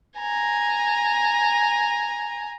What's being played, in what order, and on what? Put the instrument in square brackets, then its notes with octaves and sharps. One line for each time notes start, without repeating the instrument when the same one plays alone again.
[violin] G#5 A#5